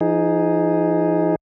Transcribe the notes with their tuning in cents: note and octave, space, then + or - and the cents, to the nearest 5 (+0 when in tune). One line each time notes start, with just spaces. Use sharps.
F3 -45 D#4 +0 G#4 +0